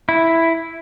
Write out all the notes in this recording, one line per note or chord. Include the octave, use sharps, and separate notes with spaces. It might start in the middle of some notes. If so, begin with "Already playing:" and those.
E4